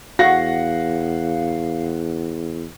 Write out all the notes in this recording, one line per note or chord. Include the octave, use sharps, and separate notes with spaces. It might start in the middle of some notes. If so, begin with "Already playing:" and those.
E2 F#4 F5 F#5 A#6